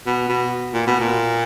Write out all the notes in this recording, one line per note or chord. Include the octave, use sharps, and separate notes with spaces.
B2
B2
A#2
B2
A#2